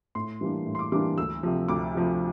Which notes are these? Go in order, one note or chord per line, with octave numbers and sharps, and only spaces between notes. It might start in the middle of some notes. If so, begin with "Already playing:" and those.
A2 C6
E3 G3 A#3 D4
A2
C6
D6
E3 G3 A#3 D4 D6
D2 E6
C3 F3
D2 D6
C3 F3